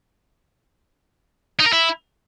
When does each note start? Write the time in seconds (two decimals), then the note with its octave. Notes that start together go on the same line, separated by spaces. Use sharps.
1.60 D#4
1.66 A#4
1.73 E4